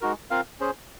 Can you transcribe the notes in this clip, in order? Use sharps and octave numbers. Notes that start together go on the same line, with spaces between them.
G#3 D#4 F#4 A#4
C4 F4 A#4 F5
C#4 G#4 C5